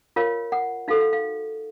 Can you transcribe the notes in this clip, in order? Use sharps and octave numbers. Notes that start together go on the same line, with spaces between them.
F4 A#4 C#5 F5
F#5
D#4 F#4 A4 C5 F5
F5
F5